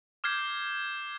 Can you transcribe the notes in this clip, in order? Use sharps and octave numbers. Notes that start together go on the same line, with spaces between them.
D6 F6 G6 G#6 C7